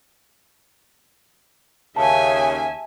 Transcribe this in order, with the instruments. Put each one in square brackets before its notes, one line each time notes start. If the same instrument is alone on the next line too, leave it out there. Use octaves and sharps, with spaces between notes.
[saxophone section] D#2 C#3 [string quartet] E5 G#5 [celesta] A5